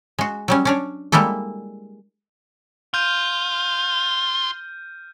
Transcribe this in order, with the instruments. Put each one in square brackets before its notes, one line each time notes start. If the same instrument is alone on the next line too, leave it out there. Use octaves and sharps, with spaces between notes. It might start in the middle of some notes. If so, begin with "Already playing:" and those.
[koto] G#3 F#4
F#3 G3 C#4
C#4 D4 C#5
G3 G#3 A#3 E4 A4
[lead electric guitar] F4 [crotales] F6 G6 D#7